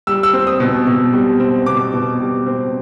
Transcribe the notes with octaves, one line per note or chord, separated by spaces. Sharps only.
G3 E6
E6
C4
D#6
B2
B2
G3
C4
B2 D6
B2
G3
C4